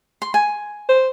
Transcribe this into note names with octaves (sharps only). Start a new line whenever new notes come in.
C6
G#5
C5